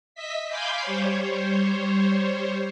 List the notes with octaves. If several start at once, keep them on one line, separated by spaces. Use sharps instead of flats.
D#5 E5 B6
F5 G#5 B5 C6 D6 G6
G3 C5 C#5